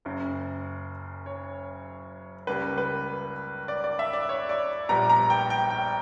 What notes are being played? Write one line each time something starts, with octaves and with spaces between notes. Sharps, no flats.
F#1 F#2 C#3
C#5
C#2 C#3 G3 A#3 B4
B4
D5
D5
E5
D5
C#5
D5
A#1 A#2 G3 B3 A#5
A#5
G5
G5
G5